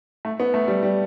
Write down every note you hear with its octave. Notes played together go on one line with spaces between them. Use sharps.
A3
B3
A3
G3
G3